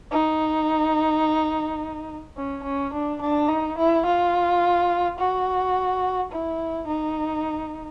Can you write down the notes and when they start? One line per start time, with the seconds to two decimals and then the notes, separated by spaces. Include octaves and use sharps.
0.11 D#4
2.37 C#4
2.64 C#4
2.93 D4
3.21 D4
3.48 D#4
3.78 E4
4.06 F4
5.19 F#4
6.32 E4
6.88 D#4